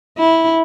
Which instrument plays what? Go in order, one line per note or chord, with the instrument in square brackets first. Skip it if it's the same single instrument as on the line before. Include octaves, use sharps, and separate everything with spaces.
[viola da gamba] E4